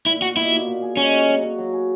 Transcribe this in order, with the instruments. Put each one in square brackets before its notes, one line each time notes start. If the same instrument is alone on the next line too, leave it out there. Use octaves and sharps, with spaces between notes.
[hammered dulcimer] A#2 [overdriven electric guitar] E4
[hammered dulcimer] A#2 [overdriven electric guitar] F#4
[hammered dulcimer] B2 [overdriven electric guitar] E4
[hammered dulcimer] A#3
A#2
G#4
[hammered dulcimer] G#3 [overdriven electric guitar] C#4
[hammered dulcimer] F#4
F#3
F#3
F#3
G#4